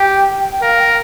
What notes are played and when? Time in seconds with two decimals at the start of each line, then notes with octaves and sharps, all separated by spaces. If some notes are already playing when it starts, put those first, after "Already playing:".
Already playing: G4 G5
0.52 G5
0.62 A#4 F5
0.80 G5